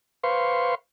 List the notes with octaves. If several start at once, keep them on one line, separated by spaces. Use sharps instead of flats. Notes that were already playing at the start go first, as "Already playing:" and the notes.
B4 C5 F5 C6 C#6